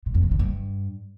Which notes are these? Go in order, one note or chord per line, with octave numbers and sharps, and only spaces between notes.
A#2
F2
C3
D3
G2